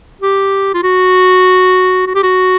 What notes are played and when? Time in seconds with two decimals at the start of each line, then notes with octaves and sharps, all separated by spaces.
0.21 G4
0.74 F4
0.83 F#4
2.07 F#4
2.15 G4
2.23 F#4